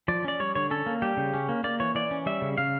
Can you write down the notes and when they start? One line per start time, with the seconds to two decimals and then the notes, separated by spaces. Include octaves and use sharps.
0.08 F3 D5
0.24 C#4 D5
0.40 G3 C#5
0.55 D3 C#5
0.70 C#4 A4
0.86 A#3
1.02 G3 G4
1.17 C#3
1.34 C#4
1.49 A#3
1.64 A#3 D5
1.80 E3 C#5
1.95 E3 D5
2.11 C#4
2.26 G3 E5
2.42 C#3
2.58 C#3 F5